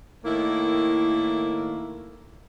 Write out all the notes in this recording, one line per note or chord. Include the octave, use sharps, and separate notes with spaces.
A2 D#3 A#3 E4